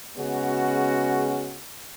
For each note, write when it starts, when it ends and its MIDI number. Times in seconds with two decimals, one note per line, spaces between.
0.16 1.59 49
0.16 1.59 56
0.16 1.59 59
0.16 1.59 61
0.16 1.59 66